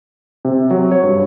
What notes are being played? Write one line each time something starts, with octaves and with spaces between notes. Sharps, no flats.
C3
F#3
C#5
G2